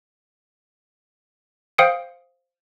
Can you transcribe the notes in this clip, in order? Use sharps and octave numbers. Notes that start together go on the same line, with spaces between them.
C5 F5 G5 D#6 C#7 D7